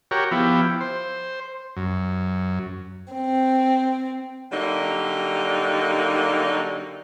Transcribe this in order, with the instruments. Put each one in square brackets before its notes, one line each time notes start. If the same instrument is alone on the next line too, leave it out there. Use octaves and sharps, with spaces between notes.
[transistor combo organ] F#4 G4 A#4 C#5
F3 B3 E4 G4
C5
F#2
[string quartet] C4
[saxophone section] D3 F#3 G3 A#3 D#4